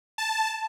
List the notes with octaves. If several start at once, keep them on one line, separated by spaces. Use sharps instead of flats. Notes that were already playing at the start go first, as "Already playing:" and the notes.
A5